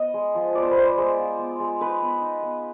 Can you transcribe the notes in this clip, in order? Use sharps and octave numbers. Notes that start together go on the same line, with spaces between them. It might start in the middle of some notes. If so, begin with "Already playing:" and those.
Already playing: B3 D#5
G#3
F3
B3 D5
C5
B4
G#3 C5
G#3
F4
B3
G#3
D#4 B4
B3
D#4
B3